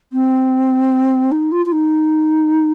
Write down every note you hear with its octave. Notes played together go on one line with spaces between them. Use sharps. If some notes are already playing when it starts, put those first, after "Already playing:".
C4
D#4
F4
F4
D#4